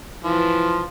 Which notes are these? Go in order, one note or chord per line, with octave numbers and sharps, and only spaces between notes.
E3 F3